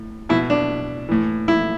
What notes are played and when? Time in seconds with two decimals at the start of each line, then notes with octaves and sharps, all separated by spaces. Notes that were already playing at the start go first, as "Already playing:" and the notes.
Already playing: A2
0.29 B2 E4
0.50 D4
1.09 A2 E3
1.48 E4